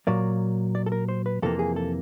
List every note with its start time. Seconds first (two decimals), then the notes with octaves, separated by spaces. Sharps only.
0.07 A#2 F#3 A#3 D5
0.75 D5
0.86 A4
0.92 A#4
1.09 C5
1.26 B4
1.42 F2 C3 E3 G3 A#3 A4
1.59 G#4
1.76 A4